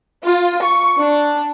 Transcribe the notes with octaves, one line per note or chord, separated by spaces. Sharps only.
F4
C#6
D4